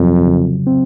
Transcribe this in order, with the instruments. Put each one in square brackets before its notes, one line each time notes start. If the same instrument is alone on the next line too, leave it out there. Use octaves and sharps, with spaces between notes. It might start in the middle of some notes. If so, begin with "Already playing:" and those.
Already playing: [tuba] F2 [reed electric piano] C3 F#3
[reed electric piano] C#3
C4